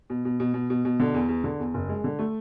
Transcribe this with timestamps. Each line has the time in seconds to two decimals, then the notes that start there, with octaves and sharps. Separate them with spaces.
0.10 B2
0.25 B2
0.40 B2
0.54 B2
0.70 B2
0.85 B2
1.00 D3
1.14 E2
1.29 E2
1.44 D3
1.59 E2
1.74 F#1
1.89 G#3
2.04 D3
2.19 A3